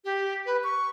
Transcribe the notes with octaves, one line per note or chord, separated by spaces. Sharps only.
G4
B4
C#6